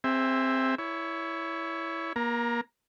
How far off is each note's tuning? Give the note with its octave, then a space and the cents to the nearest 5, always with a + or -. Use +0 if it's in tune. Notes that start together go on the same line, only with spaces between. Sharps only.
C4 +5 G#4 -25 E5 +0
E4 +0 C#5 +20
A#3 +30 A#5 +0